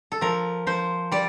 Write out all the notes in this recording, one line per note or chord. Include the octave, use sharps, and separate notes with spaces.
A4
F3 A#4
F3 C5
G3 D5